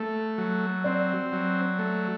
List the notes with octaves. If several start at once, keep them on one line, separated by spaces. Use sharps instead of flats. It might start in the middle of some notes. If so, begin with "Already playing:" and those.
Already playing: A3
F#3
C4 D5
F#3
A3